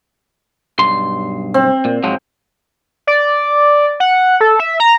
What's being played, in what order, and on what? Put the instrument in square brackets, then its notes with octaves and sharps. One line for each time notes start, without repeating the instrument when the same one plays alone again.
[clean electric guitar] B1 G2 C6
[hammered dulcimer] C4
[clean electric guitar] A#2
G#2 F3 F#3
[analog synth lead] D5
F#5
A4
E5
A#5